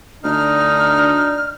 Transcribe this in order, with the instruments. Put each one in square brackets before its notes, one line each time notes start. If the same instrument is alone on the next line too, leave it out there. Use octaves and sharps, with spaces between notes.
[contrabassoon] D2 [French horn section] D4 D5 [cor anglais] D#4 [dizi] F6